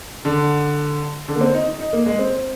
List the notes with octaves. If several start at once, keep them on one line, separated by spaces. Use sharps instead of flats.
D3
D3
A#3
C4
D#4
D#4
D#4
A#3
G#3
C4